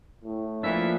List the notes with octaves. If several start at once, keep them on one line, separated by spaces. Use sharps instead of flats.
A2
E3 F3 A#3 D4 E5